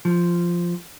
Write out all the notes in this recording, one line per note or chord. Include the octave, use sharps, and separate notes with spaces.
F3